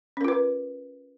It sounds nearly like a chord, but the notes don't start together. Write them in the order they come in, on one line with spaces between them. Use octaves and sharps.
C#4 A#4 F4 B4